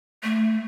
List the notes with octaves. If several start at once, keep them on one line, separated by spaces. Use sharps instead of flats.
A3